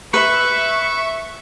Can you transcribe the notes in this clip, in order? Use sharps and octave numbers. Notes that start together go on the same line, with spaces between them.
B4 E5 C#6